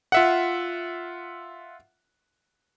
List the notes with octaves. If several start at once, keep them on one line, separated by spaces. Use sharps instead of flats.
F4 E5 F#5